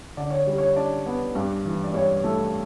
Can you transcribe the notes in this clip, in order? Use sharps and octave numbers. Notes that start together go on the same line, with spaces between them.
D3 D5
C#5
G3
C#5
D4 D5
B3
G2
E3
D5
G2 C#5
A3